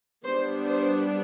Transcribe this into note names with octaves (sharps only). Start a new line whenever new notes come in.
G3 B3 D4 C5
C5